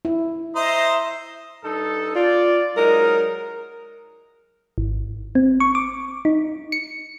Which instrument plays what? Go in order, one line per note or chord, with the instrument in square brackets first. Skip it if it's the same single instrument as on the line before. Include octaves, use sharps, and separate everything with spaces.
[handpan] E4
[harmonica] C5 D#5 A#5 [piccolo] E5
[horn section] G2 D#4 A4
[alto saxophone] F4 [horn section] D5
[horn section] F#3 G#3 D#4 [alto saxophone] A#4
[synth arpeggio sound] G#1
C4
C#6
D6
D#4
C#7